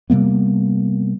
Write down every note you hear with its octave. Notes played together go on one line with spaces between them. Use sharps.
C3 G3 A#3 B3